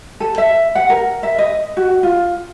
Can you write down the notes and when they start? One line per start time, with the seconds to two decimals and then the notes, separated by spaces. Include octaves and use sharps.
0.20 A4
0.38 E5
0.75 F#5
0.90 A#4
1.23 E5
1.38 D#5
1.77 F#4
2.03 F4